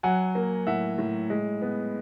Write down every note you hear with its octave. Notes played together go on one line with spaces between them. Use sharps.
F#3 F#5 G#5
A#3
A2 E5 F#5
A2
G#3
B3